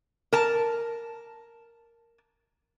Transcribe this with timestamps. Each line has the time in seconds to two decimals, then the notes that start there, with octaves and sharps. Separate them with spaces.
0.33 A#4 A5